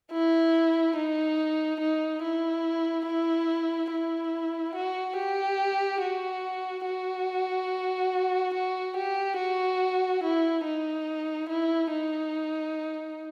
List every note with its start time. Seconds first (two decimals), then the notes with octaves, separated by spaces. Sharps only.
0.12 E4
0.96 D#4
1.80 D#4
2.22 E4
3.07 E4
3.91 E4
4.75 F#4
5.17 G4
6.01 F#4
6.85 F#4
8.54 F#4
8.96 G4
9.38 F#4
10.23 E4
10.65 D#4
11.49 E4
11.91 D#4